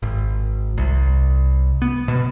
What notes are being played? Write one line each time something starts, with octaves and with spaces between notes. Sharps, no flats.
G#1
C2
B3
B2